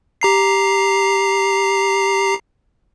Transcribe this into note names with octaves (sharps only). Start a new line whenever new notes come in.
G4 A#5 C7